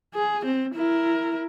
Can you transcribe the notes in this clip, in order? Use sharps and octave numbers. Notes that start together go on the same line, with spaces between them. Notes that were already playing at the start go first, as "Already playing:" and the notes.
G#4
C4
E4 A#4